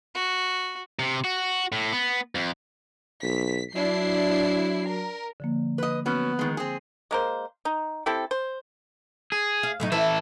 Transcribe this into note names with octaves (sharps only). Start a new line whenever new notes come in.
F#4
C3
F#4
A2
B3
F2
B1 B6
F#3 D4 E4 C7
A#4
D3 F3 A#3
B4 D#5
F#3 B3 C#4
D#3 G#3
C4 G#4
G#3 A#3 C5
D#4
C4 E4 G4 A4
C5
G#4
F5
A2 F#3 D#4
E3 E4 A4 B4